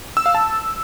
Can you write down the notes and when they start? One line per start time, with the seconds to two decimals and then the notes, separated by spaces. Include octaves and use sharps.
0.17 E6
0.26 F5
0.35 A5